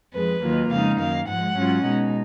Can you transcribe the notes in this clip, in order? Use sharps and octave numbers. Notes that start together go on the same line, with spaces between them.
F2 F3 G#3 B4
D#2 D#3 F#3 A#3 F4
F2 C#3 G#3 D#4 F5
F#2 D#3 A#3 F5
G#2 F3 G#3 F#5
G#2 F#3 C#4 F4
B2 G#3 D#4